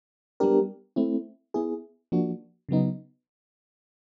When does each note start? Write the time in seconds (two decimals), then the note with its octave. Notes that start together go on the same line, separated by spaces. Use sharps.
0.40 G3 B3 D4 G4 A#4
0.96 A3 C4 E4
1.54 B3 E4 G#4
2.12 F3 A#3 D4 F#4
2.69 C#3 F#3 B3 D#4